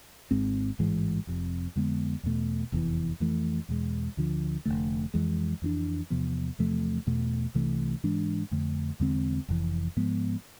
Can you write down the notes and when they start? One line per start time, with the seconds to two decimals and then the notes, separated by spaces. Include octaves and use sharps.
0.31 G#1 G#2 G#3 C4
0.79 A1 G#2 E3 G#3
1.27 F1 F2 C3
1.76 F2 D3 G#3 B3
2.23 E2 B2 A3
2.72 F1 E2 C3 E3
3.20 F2 E3 A3
3.69 E2 B2 G#3
4.17 D2 D3 F3
4.65 F1 F2 D3 A3
5.14 F2 E3 G#3
5.62 F2 E3 B3 D4
6.10 E2 C3 F3 B3
6.59 E2 C3 F3 A3
7.07 E2 B2 A3
7.54 C2 C3 E3 A3
8.04 G#2 E3 G#3 D4
8.51 F2 D3 A3
9.00 E2 D3 G#3 C4
9.48 F1 F2 E3
9.97 G#2 F3 G#3 B3